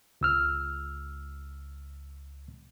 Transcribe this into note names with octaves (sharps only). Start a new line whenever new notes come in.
C#2 E6 F6